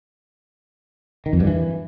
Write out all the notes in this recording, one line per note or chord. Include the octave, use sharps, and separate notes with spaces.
D#3
F2
G2
E3